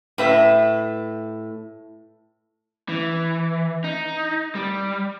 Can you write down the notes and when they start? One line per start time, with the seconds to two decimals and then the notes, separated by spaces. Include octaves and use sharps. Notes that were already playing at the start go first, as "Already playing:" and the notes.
0.18 A2 B4 E5
2.89 E3
3.84 D#4
4.55 G3